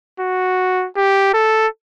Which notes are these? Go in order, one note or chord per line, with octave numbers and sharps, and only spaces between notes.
F#4
G4
A4